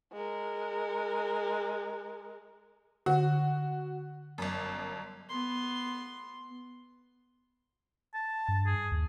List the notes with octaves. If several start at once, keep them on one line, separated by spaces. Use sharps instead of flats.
G#3 A#4
D3 F#4 F#5
G1 F#2
B3 C6
A5
G2
G#4
D#2